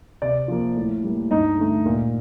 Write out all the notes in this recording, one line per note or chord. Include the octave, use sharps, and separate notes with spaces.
C3 D5
F3 A#3
A2
G3 A#3
G2 D#4 D#5
D3 A3
A#2